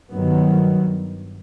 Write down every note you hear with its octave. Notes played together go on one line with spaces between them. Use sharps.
G2 D#3 F#3 B3